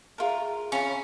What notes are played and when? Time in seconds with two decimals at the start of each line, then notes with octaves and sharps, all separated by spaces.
0.18 F4 G#4 A#4 E5 A#5
0.72 C#4 F4 B5